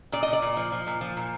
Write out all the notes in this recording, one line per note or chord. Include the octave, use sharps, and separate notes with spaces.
A#2 D5
D#5
A#2
D5
A#2
F3
F3
A#2
F3
A#2